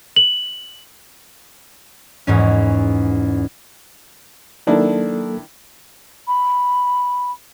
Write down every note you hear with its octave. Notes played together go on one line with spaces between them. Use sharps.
F#7
E2 G#2 C#4
D#3 F#3 A#3 D4 E4 A4
B5